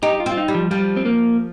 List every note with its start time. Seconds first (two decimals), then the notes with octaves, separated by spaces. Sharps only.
0.03 D#4 G4
0.20 F4
0.26 C4
0.32 F4
0.38 D#4
0.48 G3
0.55 F3
0.71 F3 G3
0.96 C4
1.05 A#3